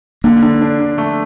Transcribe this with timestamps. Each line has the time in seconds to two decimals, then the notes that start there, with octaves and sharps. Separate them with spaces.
0.24 D3 A#3
0.42 D3
0.62 D4
0.80 D3
0.98 A3